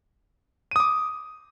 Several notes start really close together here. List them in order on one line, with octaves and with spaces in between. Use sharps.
D#7 D#6 D6